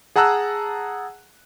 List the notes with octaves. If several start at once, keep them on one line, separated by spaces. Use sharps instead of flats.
G#4 F#5 A5 A#5 E6 F#6